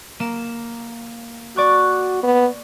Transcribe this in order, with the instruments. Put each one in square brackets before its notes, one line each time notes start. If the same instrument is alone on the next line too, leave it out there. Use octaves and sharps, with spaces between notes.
[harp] A#3 E7
[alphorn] F#4 [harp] D5 C#6 F#6
[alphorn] B3